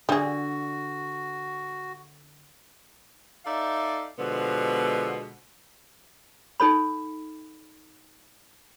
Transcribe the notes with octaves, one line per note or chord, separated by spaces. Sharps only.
D3 G3 F#4 G#4
D#4 A4 D5 E5 F5
B2 D3 F3 G#3 B3
D#4 A4 C#5 B5